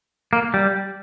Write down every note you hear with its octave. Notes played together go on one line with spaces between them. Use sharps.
A#3
G3